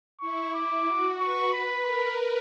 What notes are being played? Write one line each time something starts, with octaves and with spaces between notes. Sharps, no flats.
E4 C#6
D6
F#4
B4 C#6
B4 B5
A#4 B5